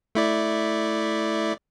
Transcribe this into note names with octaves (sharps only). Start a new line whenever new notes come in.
A3 E4 D5